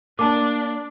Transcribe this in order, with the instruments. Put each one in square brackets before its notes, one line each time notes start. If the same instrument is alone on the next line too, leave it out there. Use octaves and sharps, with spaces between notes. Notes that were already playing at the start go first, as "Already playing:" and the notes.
[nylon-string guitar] A#3 [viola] D4 [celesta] A5 D6